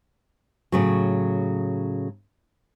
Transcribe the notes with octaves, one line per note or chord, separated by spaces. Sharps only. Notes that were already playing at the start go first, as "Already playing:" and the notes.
A2 C#3 F#3